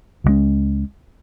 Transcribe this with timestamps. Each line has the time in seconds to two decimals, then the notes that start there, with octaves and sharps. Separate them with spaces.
0.24 C#2 C#3 G#3 C#4